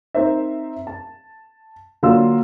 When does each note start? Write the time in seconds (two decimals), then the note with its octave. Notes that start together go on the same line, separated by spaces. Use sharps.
0.15 C4 D#4 A#4 C5 E5
0.87 A5
2.03 D3 F#3 A#3 F4 C6 E6